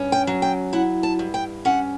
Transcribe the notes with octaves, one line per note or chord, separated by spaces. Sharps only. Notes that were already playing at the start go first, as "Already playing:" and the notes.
Already playing: G2 C#4
G5
F#3
G5
E4 F#5
A5
G2
G5
C#4 F#5